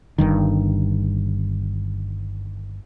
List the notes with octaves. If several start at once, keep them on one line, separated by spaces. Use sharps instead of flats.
G1 G2 D#3